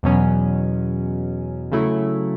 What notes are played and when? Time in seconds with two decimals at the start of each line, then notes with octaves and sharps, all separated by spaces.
0.03 E2 B2 F#3 C#4
1.72 C#3 F#3 A3 E4